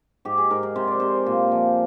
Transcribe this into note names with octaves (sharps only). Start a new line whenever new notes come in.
G#2 G4
G#4
G#2 A#4
A#4
C3 C5
D5
C3 C5
A#2
F3